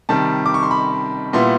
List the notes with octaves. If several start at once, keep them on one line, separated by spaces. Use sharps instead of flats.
C3 D#3 G3 A5
D6
C#6
C6
B5
A#2 G3 B3 E4 C6